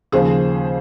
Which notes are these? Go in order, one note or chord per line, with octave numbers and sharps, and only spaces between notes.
D#2 C#3 F3 G#4 C5